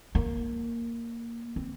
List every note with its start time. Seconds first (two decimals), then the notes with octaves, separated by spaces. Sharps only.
0.15 A#3
1.56 C4